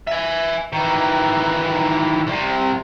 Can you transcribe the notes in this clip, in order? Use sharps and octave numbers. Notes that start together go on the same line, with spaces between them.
E5 G#5
D#3 E3
C2 C3